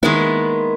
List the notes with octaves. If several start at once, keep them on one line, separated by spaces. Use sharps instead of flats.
D#3 G#3 A#3 B3 E4